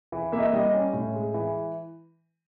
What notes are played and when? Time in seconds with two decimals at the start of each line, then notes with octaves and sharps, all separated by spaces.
0.12 E3
0.32 A#3 E5
0.38 D#5
0.43 E5
0.53 G3 D#5
0.63 D#5
0.73 C#4
0.93 A2
1.14 G#3
1.34 E3